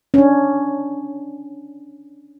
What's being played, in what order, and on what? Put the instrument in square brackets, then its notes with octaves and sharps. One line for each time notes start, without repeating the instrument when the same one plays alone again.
[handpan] C#4 D4